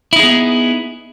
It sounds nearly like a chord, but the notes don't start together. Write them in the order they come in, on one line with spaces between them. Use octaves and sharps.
E4 D#4 G#4 B3